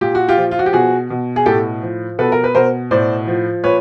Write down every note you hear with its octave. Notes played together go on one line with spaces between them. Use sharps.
A#2 G4
F#4
F4 G4
F3
F4
F#4
G4
B2 F#4 G#4
B2
G#4
A2 G4 A4
F3
B2 A4 B4
A#4
B4
B2 A#4 C5
A2 C5 D5
F3
A#2 B4 C#5